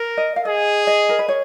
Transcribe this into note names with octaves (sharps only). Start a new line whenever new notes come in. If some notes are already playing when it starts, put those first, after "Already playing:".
Already playing: A#4
D#5
F5
G#4 D#5
D#5
A#4
B4
C#5